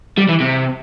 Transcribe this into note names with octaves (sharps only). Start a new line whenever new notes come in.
G3
E3
C3